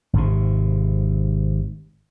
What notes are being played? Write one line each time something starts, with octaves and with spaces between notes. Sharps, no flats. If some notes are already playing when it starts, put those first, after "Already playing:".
G#1 G#2 C3